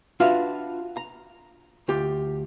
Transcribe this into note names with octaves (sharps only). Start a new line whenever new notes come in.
D4 F4 F#4 B4 E5 F5
A#5
D2 F4 G4